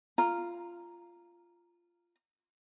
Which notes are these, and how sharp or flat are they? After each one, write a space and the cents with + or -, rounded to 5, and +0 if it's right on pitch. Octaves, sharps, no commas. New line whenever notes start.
F4 -10 A#5 +0